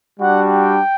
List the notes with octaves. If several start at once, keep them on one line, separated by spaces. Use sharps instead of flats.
G3 D4 F#4 F#5
G5